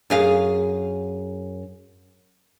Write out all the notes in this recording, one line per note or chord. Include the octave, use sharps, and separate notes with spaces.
F#2 G#4 F5